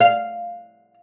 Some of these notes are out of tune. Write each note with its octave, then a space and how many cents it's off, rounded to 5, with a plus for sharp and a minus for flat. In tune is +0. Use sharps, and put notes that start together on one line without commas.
F5 -5